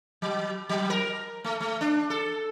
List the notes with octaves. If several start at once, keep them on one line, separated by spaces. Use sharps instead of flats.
F#3
F#3
A#4
A3
A3
D4
A4